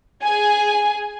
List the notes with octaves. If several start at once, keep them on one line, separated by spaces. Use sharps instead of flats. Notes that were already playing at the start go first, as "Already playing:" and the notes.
G#4 G#5